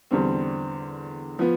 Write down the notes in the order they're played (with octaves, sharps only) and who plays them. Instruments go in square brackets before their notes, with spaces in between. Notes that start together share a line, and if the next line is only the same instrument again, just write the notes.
[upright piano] E2 D3 G3 C4
F3 B3